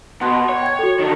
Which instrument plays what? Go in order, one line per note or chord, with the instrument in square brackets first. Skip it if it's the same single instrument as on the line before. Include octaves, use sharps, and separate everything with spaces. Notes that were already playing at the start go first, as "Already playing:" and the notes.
[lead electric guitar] B2 [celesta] F#5 C6 F#6
[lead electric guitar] C#5
[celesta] G5 G#6
F#4 A4
[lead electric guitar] D3 D#3